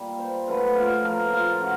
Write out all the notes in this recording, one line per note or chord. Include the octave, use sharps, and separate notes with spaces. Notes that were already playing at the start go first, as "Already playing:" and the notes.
Already playing: A#2 G3 A#3
C5
C#3 F#3 A3 B4
F4
A2 F3 A#3 A#4
F4
C#3 F#4